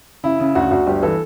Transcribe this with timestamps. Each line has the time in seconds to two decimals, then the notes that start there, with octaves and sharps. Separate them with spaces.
0.23 C#3 E4
0.40 C#3
0.55 D2 F#4
0.71 D2
0.87 G1 G4
1.03 E3 A4